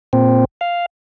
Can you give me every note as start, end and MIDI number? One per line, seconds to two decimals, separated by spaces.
0.13 0.45 46
0.13 0.45 60
0.61 0.86 77